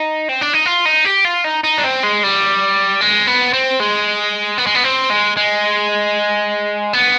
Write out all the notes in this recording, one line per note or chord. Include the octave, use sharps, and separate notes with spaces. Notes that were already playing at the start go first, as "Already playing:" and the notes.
Already playing: D#4
C4
D4
D#4
F4
D#4
G4
F4
D#4
D#4
D4
C4
G#3
G3
G#3
B3
C4
G#3
B3
G#3
B3
C4
G#3
G#3
B3